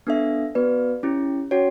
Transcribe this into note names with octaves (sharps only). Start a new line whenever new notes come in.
B3 D4 A4 E5
B3 F#4 B4 D5
C#4 E4 G4
C#4 F#4 C#5 G5